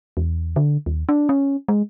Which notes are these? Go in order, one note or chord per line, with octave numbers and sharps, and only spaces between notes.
E2
D3
D#2
D4
C#4
G#3